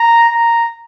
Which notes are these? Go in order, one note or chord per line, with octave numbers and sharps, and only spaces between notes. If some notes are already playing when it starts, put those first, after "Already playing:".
Already playing: A#5
A#5